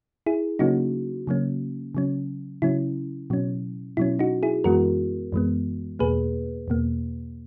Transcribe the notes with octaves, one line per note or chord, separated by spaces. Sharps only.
E4 G#4
C#3 F#3 A#3 C#4 D#4 F#4
C#3 F#3 A#3 C#4
C#3 F#3 C#4
C#3 F#3 C#4 E4
B2 F#3 C#4
B2 F#3 C#4 E4
D#4 F#4
E4 G#4
F#2 E3 G#3 B3 F#4 A#4
F#2 E3 G#3 B3
E2 B2 A#3 G#4 B4
E2 B2 A#3